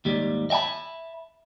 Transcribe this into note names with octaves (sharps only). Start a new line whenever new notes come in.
D#2 G#2 G3 G4
D#5 E5 G5 A5 B5